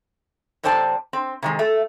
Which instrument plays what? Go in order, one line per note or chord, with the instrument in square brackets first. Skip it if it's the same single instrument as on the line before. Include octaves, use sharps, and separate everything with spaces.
[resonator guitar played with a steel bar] F#2 C3 C5 D5 A5
C4
C3 D#3 G#3
A3 E5